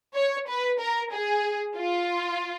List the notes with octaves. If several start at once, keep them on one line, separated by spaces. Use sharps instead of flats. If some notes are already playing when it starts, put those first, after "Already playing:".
C#5
B4
A#4
G#4
F4